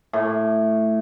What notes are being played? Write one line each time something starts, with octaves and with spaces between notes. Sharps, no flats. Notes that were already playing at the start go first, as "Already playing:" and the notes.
A2